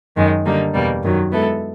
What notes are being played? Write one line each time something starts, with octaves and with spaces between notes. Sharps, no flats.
F#2 D#3 G#3
D3 G3 A#3 D#4
E2 B2 G3 A#3
F#2 D#3 F#3
G#3 B3 E4 A4